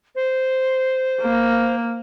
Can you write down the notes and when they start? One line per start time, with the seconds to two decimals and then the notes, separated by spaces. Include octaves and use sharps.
0.16 C5
1.21 A#3